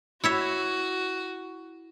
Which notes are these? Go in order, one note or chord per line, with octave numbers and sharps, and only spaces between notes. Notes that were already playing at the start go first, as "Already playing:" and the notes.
E4 F#4 C#5 E5